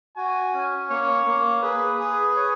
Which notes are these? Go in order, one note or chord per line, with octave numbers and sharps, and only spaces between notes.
F#4 G#5
C#4
A#3 C#5
A#3
G#4 B4
G#4
C#5